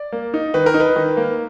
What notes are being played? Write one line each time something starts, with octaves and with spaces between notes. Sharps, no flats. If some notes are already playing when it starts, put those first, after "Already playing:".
Already playing: D5
A#3
D#4
D#3 B4
A#4
D#4
B4
D#3
A#3